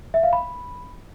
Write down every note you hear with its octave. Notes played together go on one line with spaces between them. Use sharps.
E5
F5
B5